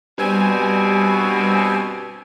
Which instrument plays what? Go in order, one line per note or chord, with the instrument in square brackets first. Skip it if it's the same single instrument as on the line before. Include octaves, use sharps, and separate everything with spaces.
[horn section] G2 B2 C4 [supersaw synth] G3 G#5